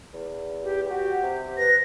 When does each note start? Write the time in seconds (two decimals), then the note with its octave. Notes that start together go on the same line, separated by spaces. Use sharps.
0.14 E2
0.63 G4
0.90 F#4 G4
1.23 C3
1.58 B4 A#6